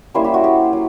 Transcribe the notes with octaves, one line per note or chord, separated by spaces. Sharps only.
G3 A#3 C#4 E4 C5
G4
F#4
G4
F#3